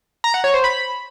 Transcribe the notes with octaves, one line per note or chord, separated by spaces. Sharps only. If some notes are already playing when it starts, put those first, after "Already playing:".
A#5
F#5
C#5
C5
B5